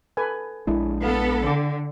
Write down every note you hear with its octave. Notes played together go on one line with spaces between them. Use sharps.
A4 B4 G#5
A#1 G#3 D4 E4
B3 A4 F5
D3 G5 D6